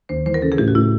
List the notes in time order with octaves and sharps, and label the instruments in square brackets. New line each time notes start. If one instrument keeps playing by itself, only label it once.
[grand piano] D#2 [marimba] C5
[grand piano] E3 [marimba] C5
[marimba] A#4
[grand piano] C#3 [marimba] A4
[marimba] G#4
[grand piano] A2 [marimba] G4
[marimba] F#4
[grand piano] A2 [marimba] E4